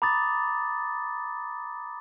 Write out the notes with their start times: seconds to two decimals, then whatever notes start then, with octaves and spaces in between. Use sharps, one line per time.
0.02 A#5 B5 D6 D#6 A6